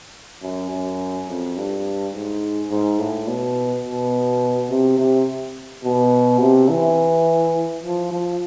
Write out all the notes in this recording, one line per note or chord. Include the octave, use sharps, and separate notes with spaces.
F#2
F#2
F2
G2
G#2
G#2
A2
B2
B2
C3
C3
B2
C3
E3
F3
F3